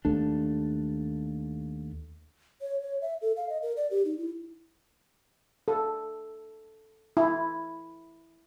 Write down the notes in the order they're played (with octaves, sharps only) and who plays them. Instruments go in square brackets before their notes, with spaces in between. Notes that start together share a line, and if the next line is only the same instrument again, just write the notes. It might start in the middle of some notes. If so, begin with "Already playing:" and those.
[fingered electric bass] D#2 A3 D4
[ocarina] C#5
C#5
E5
A4
F5
D#5
A#4
D5
G4
D#4
E4
[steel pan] A4
E4